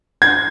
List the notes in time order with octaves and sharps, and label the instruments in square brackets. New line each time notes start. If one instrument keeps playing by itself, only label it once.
[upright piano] G#6